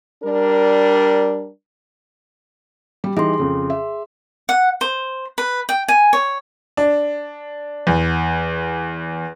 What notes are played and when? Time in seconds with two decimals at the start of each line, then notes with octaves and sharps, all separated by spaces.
0.23 G3 D4 A#4
3.04 G3
3.17 E3 G3 D#4 G#4 C6
3.39 F2 C#3
3.70 E5
4.49 F#5
4.81 C5
5.38 B4
5.69 G5
5.88 G#5
6.13 C#5
6.77 D4
7.87 E2